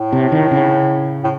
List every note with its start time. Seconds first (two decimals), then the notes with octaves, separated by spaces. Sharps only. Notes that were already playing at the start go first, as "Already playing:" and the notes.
Already playing: A2
0.12 C3
0.32 D#3
0.51 C#3
1.24 A2